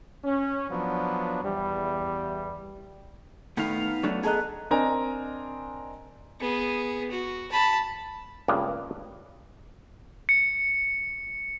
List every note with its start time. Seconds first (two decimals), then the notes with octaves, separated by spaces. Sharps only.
0.24 C#4
0.70 F3 F#3 B3 D4
1.43 E2 G3
3.57 A2 D#3 B3 D#4 F5
4.03 F#3 A3 D4
4.24 G#4 A4 D#5 A5 A#5 F#6
4.71 C4 D4 A#4 D#5 G#5 A#5
6.41 B3 G#4
7.11 F#4
7.52 A5 B5
8.48 C#2 G2 A#3 B3
10.29 C#7